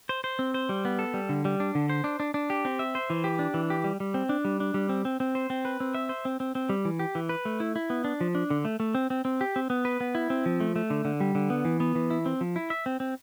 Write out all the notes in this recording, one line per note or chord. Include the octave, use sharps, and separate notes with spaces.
C5
C5
C4
C5
G3
B3
A4
G3
D3
G3
D4
D3
C5
D4
D4
D4
G4
C4
E5
C5
E3
G4
D4
E3
G4
G3
G3
C4
D4
G3
D4
G3
C4
C4
C4
C5
C4
B4
C4
E5
C5
C4
C4
C4
G3
E3
G4
E3
B4
A3
E4
E4
B3
D4
F3
D4
D3
A3
A3
C4
C4
C4
G4
C4
B3
B4
B3
E4
C4
F3
A3
A3
D3
D3
G3
D3
B3
E3
B3
E3
E4
C4
F3
E4
E5
C4
C4